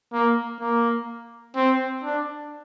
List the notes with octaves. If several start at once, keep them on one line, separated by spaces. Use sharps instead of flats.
A#3
A#3
C4
D4